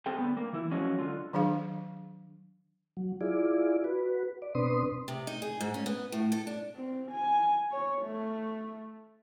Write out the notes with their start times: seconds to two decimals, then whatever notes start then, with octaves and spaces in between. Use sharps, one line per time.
0.06 C4 G#4 A4 G5
0.18 D3 B3
0.37 A#3
0.53 E3 E4
0.71 F3 F#3 G#3 C#4
0.99 D3 F4
1.33 D#3 F#3 D4 G#4 F5
2.97 F#3
3.21 E4 F4 G#4 D5
3.84 F#4 B4
4.42 D5
4.55 B2 C4 D4 B4 C6 D#6
5.08 C3
5.27 D#4
5.42 G#4
5.61 G#2
5.74 C#4
5.86 B3
6.12 A2
6.32 A4
6.47 D4
6.76 C4
7.12 G#5
7.72 C#5
8.02 A3